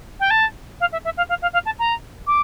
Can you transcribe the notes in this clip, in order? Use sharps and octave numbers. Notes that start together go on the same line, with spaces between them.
G5
A5
F5
E5
E5
F5
F5
F5
F5
A5
A#5
D6